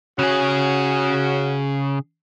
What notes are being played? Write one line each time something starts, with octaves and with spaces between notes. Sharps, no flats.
C#3 C#4 F#4 G#4